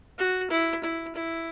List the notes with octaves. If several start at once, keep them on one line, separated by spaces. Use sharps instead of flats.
F#4
E4
E4
E4